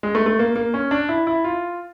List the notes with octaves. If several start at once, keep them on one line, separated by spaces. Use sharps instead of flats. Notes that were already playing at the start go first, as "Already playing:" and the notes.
G#3
A3
A3
A#3
A#3
C#4
D4
E4
E4
F4